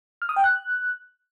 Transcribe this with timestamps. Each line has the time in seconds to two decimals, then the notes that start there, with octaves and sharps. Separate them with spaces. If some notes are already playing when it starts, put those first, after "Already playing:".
0.22 F6
0.29 D#6
0.36 G5
0.44 F#6